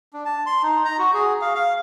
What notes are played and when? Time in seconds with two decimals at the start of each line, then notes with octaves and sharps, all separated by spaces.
0.13 D4
0.25 A5
0.46 C6
0.62 D#4
0.85 A#5
0.98 F#4
1.14 G#4
1.41 F5
1.55 F5